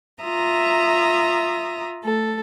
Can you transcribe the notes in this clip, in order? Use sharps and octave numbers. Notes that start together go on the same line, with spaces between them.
F4 E5 A#5 D#6
A3 A4